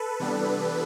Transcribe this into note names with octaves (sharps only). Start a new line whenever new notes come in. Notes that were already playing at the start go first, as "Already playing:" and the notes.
Already playing: A4 B4
C3 E3 G3 B3 D4